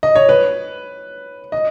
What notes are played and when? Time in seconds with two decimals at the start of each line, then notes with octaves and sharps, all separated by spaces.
0.03 D#5
0.15 C#5
0.29 B4
1.52 D#5